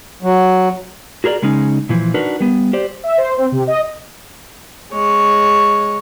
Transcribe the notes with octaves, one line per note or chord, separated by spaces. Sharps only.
F#3
F#4 G#4 A#4 C5 D5
C#3 G#3 C#4 D#4
A#2 E3 F3
D4 D#4 F#4 A#4 B4
G3 B3
G4 C5 D5
E5
C5
C4
C3
D#5
G#3 C#5